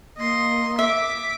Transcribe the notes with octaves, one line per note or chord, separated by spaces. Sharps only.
A#3 D#5 C6
E5 D6 B6